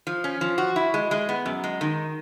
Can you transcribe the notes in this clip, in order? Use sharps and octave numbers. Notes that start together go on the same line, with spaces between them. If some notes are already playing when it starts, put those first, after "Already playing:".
F3
C#4
F3
F#4
E4
G#3
G#3
B3
F#2
G#3
D#3